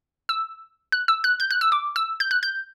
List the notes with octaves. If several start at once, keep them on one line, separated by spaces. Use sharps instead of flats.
E6
F#6
E6
F#6
G6
F#6
E6
D6
E6
G6
F#6
G6